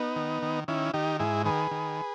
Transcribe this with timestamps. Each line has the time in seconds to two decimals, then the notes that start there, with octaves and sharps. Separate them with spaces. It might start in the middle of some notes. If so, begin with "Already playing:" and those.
Already playing: B3 D#4
0.16 D#3
0.43 D#3
0.68 D#3 C#4 E4
0.94 D#3 D#4 G4
1.19 G#2 E4 G#4
1.45 D#3 G#4 B4
1.71 D#3